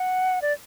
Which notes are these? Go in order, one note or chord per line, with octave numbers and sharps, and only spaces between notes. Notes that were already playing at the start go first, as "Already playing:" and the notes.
Already playing: F#5
D5